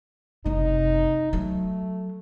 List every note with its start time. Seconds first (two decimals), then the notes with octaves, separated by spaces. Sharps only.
0.46 F#1 C3 D#4
1.33 F#3 A3